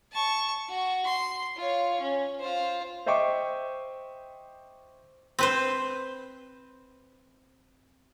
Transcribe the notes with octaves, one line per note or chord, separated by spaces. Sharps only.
A5 C#6
F#4
C6
F4 C#5
C#4
F4 C5
C5 D#5 E5 G5 C#6 D6
C4 B4 C5